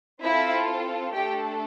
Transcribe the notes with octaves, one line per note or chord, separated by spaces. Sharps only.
C4 E4 F4 A4 E5
A3 D4 G4 A4 G5